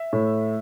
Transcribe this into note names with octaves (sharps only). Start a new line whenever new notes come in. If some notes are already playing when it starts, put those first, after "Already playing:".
Already playing: E5
A2